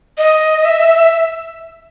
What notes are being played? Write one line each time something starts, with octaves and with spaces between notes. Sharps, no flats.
D#5
E5